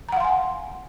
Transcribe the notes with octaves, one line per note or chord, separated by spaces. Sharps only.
F5 F#5 G#5 A#5 C6